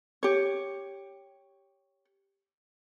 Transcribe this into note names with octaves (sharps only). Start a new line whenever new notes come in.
G4 C#5